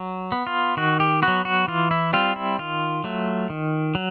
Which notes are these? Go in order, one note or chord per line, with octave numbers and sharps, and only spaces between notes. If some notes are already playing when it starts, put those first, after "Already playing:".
Already playing: F#3
B3
F4
D#3 F#4
G4
B3 F#4
F#3
F#4
E3 F4
E4
G3 C4 F4
E4
D#3 F4
F#3 A3
D#3
F#3